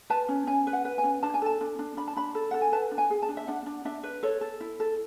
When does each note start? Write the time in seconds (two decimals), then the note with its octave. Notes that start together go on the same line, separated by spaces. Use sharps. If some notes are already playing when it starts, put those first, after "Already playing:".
0.10 B4 A5
0.29 C#4
0.47 C#4 G#5
0.67 B4
0.73 F#5
0.85 B4
0.98 G#5
1.04 C#4
1.23 D4 A5
1.34 G#5
1.42 A4 A5
1.61 D4
1.79 D4
1.97 D4 B5
2.08 A5
2.16 D4 B5
2.35 A4
2.51 A4 F#5
2.61 G#5
2.72 B4 A5
2.91 D4
2.98 G#5
3.10 G#4
3.22 A5
3.29 D4
3.37 E5
3.47 D4 F#5
3.66 D4
3.85 D4 E5
4.03 B4
4.23 A4 C#5
4.41 A4
4.61 E4
4.80 A4